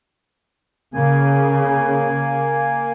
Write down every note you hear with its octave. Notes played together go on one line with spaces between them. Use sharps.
C#3 A#3 G#5